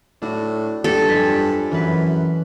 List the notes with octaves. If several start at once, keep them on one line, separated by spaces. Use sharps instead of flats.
A2 D4 F#4
G2 G4 A4
F2 G#5 B6
F#2 E3 B4